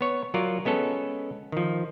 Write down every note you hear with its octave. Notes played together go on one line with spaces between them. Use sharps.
B3 C#5
F#3 F4 A#4 D5
G#3 B3 C#4 A4
D#3 F3